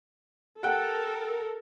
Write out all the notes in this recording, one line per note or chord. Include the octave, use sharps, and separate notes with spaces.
G4 A4 A#4 F#5 G5 F#6